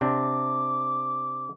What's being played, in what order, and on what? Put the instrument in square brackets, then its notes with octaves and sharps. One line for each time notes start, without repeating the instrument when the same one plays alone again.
[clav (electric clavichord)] C3 C4 D4 [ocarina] D6